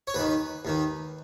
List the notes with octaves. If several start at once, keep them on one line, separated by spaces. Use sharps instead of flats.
C#5
D#2 D#3 B4
D#2 D#3